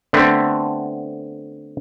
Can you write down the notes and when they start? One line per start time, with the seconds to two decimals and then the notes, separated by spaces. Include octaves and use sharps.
0.13 D3 A3 B3 C4